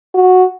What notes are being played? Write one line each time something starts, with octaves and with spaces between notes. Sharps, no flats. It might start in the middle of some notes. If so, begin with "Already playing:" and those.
F#4